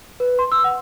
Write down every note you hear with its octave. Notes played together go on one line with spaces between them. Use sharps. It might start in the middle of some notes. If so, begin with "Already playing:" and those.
B4
C6
E6
F#5